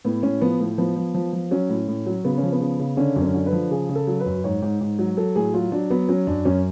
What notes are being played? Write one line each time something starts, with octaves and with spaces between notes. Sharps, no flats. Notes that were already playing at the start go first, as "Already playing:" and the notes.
A2 B3
A2 C#4
F3 B3
A2
F3 B3
F3
F3
F3
F#3 C#4
A2
A2
F#3
C#3 B3
F3 C#4
B3
C#3
C#3
D3 C#4
F#2
C#4
D3
B4
F3
C#3 G#4
C#3
A4
F#3
B4
F#2
G#2 C#5
G#2
G#2
F#3
F#3 A4
A2 G#4
F#3 F4
F#3 D4
F#3 B3
F#3 C#4
F#2 D4
F#2 C#4